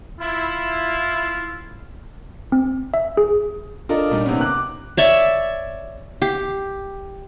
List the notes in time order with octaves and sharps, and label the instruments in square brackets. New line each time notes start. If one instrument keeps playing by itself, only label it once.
[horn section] E4 [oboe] F4
[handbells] C4
E5
G#4
[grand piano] D4 F4 A4 A#4 D#5
A#2 G3 D4 D#4
C3 D#3 A#3 B3 C#4
D6 F#6
[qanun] C#5 D5 E5
G4